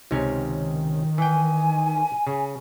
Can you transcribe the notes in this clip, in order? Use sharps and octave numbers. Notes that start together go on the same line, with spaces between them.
C#2 C3 D#3 C#4
E3 G5 G#5
C#3